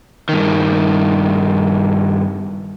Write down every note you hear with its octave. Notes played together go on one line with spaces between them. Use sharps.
G2 D#3